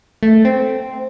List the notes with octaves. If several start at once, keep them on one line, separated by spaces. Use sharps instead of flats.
A3
C4